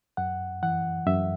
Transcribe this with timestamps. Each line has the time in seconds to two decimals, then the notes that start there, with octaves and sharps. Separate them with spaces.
0.17 F#2 F#5
0.63 E3 F#5
1.06 F#2 E5